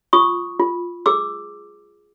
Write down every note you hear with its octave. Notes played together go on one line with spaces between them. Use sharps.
F4 C#6 D#6
F4
G#4 D6 E6